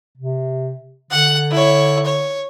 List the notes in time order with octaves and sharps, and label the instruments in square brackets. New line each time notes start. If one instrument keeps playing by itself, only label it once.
[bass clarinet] C3
[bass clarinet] D3 [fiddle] F#5
[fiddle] E4 C#5
C#5